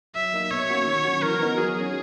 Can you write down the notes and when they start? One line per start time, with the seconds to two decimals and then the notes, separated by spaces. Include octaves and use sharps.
0.15 F#3 E5
0.34 A#3 D#4
0.51 B2 C#5
0.70 A#3 C#4 F#4
0.87 D#3
1.05 F#3 C#4 F#4
1.23 E3 A#4
1.40 B3 D#4 F#4
1.58 F#3 G#4
1.77 C#4 F#4